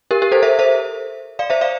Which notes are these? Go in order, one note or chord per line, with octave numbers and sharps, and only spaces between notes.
G4 A#4
G4 A#4
A4 C5
C5 E5
C5 E5
D5 F5
C5 E5
D5 F5